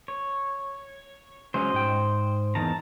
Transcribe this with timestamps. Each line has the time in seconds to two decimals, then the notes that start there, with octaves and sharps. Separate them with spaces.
0.08 C#5
1.54 F#3 G#3 C#4 C5 D#5
1.74 G#2 G5
2.55 E2 D#3 A5 A#5